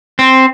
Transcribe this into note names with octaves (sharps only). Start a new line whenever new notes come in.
C4